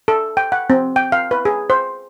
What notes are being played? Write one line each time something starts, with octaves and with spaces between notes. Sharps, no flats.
A4
G5
F#5
C4
G5
F5
B4
G#4
C5